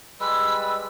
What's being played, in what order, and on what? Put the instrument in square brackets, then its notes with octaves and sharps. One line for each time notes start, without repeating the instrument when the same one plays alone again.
[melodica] G3 G#3 B4 [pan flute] E6